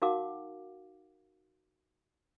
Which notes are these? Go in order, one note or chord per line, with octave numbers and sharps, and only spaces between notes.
D#4 F#4 A#4 F5 F#5 D6